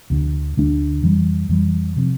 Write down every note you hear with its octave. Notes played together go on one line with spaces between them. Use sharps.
D2 D3 A3 D4
D2 D3 A3 D4
F2 E3 G3
F2 E3 G3
C3 F3 C4